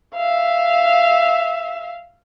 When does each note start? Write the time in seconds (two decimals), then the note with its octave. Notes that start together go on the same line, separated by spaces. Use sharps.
0.15 E5 F5